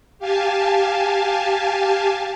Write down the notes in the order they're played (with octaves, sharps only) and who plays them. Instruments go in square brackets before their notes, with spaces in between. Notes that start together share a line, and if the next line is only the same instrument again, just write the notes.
[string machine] G4 F5 G#5 A5